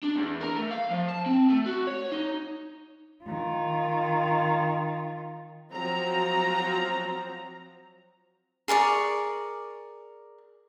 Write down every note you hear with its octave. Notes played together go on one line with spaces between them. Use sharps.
D4
E2
A#4
A3
F5
F3
A5
C4
A3
F#4
C#5
D#4
D#3 F4
F3 F#3 C4 F#4 A#5
G#4 A#4 D5 C#6